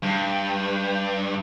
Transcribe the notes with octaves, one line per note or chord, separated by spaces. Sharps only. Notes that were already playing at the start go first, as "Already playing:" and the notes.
G2